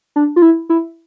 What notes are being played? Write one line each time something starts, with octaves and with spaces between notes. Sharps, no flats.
D4
F4
E4
E4